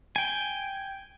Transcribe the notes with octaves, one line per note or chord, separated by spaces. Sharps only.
G5 G#5